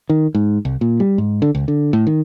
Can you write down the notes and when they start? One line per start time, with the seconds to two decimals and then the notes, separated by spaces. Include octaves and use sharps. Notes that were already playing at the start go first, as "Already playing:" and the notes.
0.10 D#3
0.35 G#2
0.65 C2
0.81 A#2
1.00 G3
1.18 G#2
1.42 D3
1.55 C#2
1.68 D3
1.93 A2
2.07 D#3